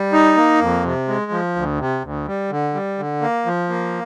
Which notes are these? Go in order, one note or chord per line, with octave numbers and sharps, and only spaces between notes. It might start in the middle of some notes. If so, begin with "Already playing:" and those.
Already playing: G3
D#4
A#3
F2
C3
G#3
F3
D2
C3
D2
G3
D3
G3
D3
A#3
F3
A#3